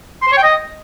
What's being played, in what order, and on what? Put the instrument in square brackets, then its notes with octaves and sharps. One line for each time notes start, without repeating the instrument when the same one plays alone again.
[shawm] C6
C5
C#5
G5
D#5